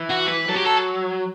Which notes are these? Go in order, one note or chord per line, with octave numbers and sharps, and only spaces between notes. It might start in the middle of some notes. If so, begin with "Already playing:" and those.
Already playing: E3
F#4
B4
F#3 A4
G4
A4